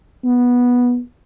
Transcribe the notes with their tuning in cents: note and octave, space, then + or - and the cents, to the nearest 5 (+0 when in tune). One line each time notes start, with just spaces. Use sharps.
B3 -10